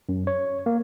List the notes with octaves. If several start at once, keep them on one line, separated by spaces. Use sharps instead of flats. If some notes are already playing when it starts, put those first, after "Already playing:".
F#2
C#5
A#3